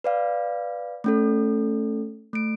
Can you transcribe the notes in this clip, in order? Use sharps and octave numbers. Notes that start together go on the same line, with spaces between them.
B4 D5 F5
A3 C#4 A4
A3 D7